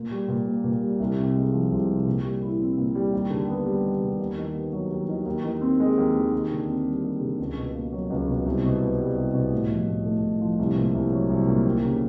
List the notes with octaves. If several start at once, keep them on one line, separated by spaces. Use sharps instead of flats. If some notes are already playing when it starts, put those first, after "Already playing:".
Already playing: A#2
G3
A#2
A#3
A#2
G3
C2
C3
G#3
F3
C2
C3
A#2
G3
E4
C4
A#2
G3
D#2
D3
B3
G3
D#2
D3
D#2
D#3
B3
F#3
D#2
D#3
D#2
D#3
C4
G#3
D#2
D#3
D#2
D3
C4
G3
D#2
D3
C#2
B2
A#3
F#3
C#2
B2
C2
B2
B3
G3
C2
B2
A2
F3
A2
A3
A2
F3
C2
A#2
C2
F#3
C2
A#2
D#2
C#3